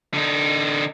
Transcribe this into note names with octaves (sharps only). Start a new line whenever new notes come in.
D3 D#4